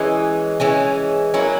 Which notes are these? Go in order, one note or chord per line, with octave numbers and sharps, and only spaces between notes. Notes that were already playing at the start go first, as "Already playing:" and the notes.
Already playing: E3 G#3 C#4
E3 G#3 C#4
F#3 A#3 C#4 E4